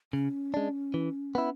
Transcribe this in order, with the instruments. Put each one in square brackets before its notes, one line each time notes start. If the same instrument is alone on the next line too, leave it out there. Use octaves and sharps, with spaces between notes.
[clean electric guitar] C#3 [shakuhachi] C#4
[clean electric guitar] G#3 D4
E3
B3 E4